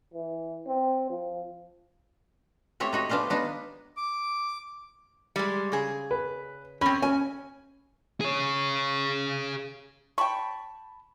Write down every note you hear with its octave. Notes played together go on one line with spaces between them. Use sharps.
E3
C4
F3
A3 C4 G4 C#5
D#4 F#4 C#5
F3 B3 D4 F4 G4
B3 D4 D#4
D6
G3 G#3
C#3 G#4
B4
C4 C#4 B5
C#4 G#5
G#4 C#5
G5 A5 B5 C#6